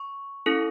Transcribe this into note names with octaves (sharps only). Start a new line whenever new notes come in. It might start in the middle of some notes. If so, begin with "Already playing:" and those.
Already playing: C#6
C#4 E4 A4